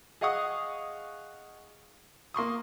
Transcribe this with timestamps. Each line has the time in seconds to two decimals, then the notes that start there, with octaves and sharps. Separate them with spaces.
0.21 G#4 D#5 F5 F#5 C#6 D#6
2.34 A#3 C6 C#6 D#6